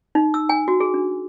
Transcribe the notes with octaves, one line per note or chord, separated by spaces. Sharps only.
D#4
E6
G#5
F#4
G#4
D4